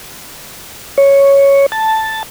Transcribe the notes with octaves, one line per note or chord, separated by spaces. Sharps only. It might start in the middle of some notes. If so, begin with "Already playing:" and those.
C#5
A5